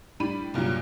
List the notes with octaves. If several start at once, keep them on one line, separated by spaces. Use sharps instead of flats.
A2 G3 D4 B5 D#7
C2 G2 A#2 F#3